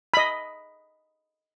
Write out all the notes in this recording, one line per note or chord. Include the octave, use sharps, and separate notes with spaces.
D#5 B5